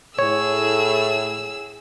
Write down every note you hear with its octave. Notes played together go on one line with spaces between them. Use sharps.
A2 G#4 C#5 E6